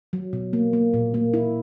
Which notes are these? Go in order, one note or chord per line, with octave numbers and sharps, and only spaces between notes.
F#3
B2
A#3
A#3
A#2
A#3
E4